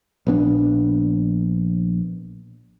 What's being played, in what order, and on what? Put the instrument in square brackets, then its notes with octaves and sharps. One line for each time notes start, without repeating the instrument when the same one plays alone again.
[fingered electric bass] A#1 B3 D4